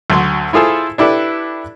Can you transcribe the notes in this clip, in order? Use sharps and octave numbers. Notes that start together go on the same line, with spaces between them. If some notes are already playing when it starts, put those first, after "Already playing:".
D2 F#3 C6
E4 F4 G#4 A4 C5
D4 E4 G4 A4 B4